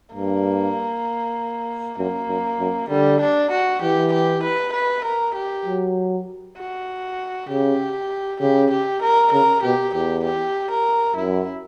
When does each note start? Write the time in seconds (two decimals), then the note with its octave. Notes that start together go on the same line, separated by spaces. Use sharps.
0.14 G2 A#3
1.98 F#2 A#3
2.29 F#2
2.59 F#2
2.89 D3 G3
3.21 D4
3.51 F#4
3.82 E3 G4
4.13 G4
4.43 B4
4.73 B4
5.05 A#4
5.35 G4
5.65 F#3
6.57 F#4
7.48 C#3 G4
8.40 C#3 G4
8.71 G4
9.02 A#4
9.32 C#3 A#4
9.63 B2 G4
9.94 E2 G4
10.24 G4
10.71 A#4
11.16 F#2 E4